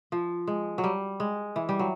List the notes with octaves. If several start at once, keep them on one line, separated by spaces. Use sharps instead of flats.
F3
G#3
F#3
G3
G#3
E3
G3
F#3